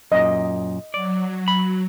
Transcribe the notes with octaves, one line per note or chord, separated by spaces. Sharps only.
F#2 A#2 D#5
F#3 D5
B5